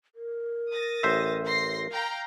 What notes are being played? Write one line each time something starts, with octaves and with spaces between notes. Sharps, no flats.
A#4
D#6 A6 A#6
A1 C5 E5
C6 A#6 C7
F5 G5 A#5